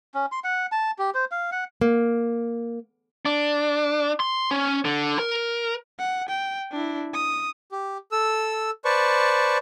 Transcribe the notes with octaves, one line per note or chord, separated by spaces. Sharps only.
C#4
C6
F#5
A5
G4
C5
F5
F#5
A#3
D4
C6
C#4
D3
A#4
F#5
G5
D4 E4
D#6
G4
A4 E6
B4 C5 D5 A5 C#6